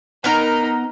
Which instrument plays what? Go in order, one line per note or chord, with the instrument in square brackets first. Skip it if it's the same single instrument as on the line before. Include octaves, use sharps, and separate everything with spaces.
[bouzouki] B3 A#4 A#5 [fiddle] D#4